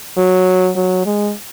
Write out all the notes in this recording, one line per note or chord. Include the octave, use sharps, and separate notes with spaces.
F#3
F#3
G#3